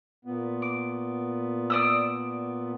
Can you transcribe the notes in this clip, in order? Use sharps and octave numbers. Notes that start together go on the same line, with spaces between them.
A#2 B3
D6
D5 D#6 E6